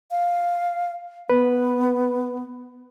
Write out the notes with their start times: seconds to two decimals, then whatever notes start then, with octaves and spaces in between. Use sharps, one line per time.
0.11 F5
1.30 B3 B4